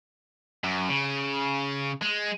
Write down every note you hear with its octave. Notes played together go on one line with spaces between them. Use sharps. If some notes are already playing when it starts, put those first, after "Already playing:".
F#2
C#3
G#3